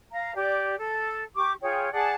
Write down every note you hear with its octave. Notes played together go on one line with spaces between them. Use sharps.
F5 A#5
G4 D5
A4
G4 C#6 D6
F4 G#4 C#5 G5
G#4 D5 F#5 A5